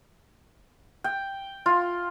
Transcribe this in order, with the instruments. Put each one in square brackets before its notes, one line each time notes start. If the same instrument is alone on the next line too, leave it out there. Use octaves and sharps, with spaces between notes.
[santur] G5
F4